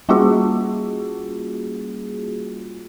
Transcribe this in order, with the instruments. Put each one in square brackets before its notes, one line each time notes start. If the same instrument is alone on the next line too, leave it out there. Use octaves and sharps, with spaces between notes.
[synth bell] G3 A#3 C#4 F4 F#4 G#4